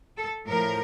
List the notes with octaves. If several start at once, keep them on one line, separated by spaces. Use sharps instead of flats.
A4
A2 F3 A#4